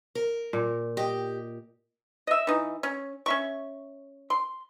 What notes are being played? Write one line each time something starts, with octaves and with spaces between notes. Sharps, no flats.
A#4
A#2
G4 D#5
D#5 E5
E3 D#4
C#4
C#4 E5 C#6
C6